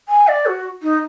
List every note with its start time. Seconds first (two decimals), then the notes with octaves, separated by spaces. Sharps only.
0.09 G#5
0.28 D5
0.46 F#4
0.82 D#4